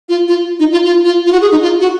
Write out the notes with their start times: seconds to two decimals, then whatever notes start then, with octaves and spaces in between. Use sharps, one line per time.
0.09 F4
0.28 F4
0.60 D#4
0.72 F4
0.86 F4
1.05 F4
1.26 F4
1.32 F#4
1.42 G#4
1.51 D#4
1.62 F4
1.81 F#4